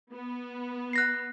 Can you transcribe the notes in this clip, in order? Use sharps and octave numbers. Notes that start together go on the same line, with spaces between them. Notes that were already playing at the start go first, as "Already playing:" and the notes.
B3
F#6 A#6 C7